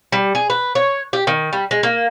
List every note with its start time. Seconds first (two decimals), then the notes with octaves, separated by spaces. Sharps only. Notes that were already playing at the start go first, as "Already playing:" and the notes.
0.12 G3
0.35 G#4
0.50 B4
0.75 C#5
1.13 G4
1.27 D#3
1.53 G3
1.71 G#3
1.83 A#3